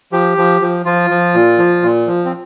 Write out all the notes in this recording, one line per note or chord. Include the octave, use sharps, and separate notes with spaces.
F3 G4
F3
F3
F3 F4
F3
A#2
F3
A#2
F3
C4